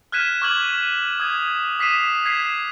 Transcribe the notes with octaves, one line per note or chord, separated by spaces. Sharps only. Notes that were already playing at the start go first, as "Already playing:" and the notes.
F6 F#6 G#6 B6 D#7 E7
C#6 D6 F6 G#6 F#7
D#6 G#6
D#6 B6 C7 D#7 E7
G#6 B6 C7 E7